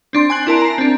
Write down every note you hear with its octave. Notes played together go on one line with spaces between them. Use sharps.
C4 D4 C6
G#5 C6 F#6 F#7
E4 A#4 A5 D7
A#5 C7
C4 D4